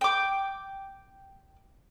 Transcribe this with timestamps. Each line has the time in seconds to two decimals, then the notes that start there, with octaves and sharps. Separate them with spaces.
0.01 G5 D6